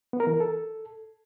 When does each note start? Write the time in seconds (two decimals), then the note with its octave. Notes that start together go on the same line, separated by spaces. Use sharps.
0.13 B3
0.20 A#4
0.27 E3
0.34 A#4
0.40 A4